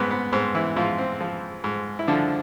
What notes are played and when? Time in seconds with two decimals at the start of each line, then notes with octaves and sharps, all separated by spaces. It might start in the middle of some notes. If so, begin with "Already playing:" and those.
Already playing: G#2 B3 C4
0.11 B3
0.32 G#2 C4
0.55 E3 E4
0.76 G#2 F3 F4
0.98 C4
1.21 F3
1.64 G#2
1.99 E4
2.07 D3 F3 D4